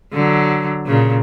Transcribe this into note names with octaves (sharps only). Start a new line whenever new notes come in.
D3 F#3
A#2 C#3